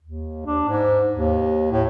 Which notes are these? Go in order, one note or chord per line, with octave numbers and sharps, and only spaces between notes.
D#2
D4
G#2
D#2
A2